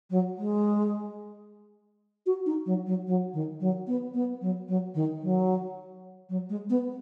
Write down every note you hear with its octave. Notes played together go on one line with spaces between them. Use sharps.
F#3
G#3
F#4
D#4
F#3
F#3
F#3
D#3
F#3
B3
B3
F#3
F#3
D#3
F#3
F#3
G#3
B3